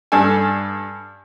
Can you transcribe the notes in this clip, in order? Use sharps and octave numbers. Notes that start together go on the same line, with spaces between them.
G2 D4 A4 G#5